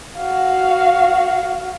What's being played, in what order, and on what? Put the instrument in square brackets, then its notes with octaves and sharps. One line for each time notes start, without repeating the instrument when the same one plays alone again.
[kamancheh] F#4 F5